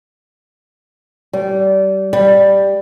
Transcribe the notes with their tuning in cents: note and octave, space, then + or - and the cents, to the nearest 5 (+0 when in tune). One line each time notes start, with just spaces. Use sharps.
G3 -25
G3 +5